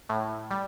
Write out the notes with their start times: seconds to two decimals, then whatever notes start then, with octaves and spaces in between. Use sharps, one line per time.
0.09 A2
0.51 G3